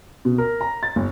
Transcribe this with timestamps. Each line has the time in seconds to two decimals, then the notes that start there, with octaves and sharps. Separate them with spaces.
0.25 B2
0.38 A#4
0.61 A#5
0.83 A6
0.96 G1